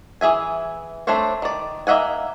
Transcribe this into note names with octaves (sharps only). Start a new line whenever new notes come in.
E3 G#4 E5 G#5
A3 C4 D4 C5 C#5
D#3 D5
A#3 D#5 E5 F#5 G#5